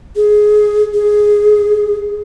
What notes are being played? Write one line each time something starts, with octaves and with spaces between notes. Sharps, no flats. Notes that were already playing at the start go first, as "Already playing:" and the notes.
G#4
G#4